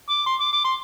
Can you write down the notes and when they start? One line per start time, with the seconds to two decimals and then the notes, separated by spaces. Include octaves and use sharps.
0.10 D6
0.26 C6
0.40 D6
0.53 D6
0.64 C6